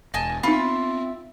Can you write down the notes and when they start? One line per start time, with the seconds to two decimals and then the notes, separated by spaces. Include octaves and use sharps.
0.14 E1 D#5 G#5 A5
0.43 B3 C4 D#4 F4 E5 B5